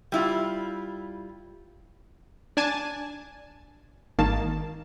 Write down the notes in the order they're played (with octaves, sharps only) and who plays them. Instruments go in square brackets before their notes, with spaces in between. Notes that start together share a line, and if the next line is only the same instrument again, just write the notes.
[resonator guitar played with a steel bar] G3 E4 F4
[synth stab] D4 G#5 A5
G#1 D#3 A#3 A5